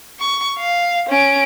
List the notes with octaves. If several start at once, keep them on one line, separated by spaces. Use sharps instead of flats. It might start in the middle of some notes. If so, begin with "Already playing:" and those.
C#6
F5
C#4 D7